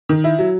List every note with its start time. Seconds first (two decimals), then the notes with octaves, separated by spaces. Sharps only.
0.09 D#3
0.24 E4
0.39 F#3